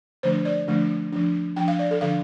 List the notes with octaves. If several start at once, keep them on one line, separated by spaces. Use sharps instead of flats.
D3 F3 A3 D4 C5
D5
D3 F3 A3 D4
F3 D4
F3 D4 G5
F5
D5
A4
D3 F3 D4 F5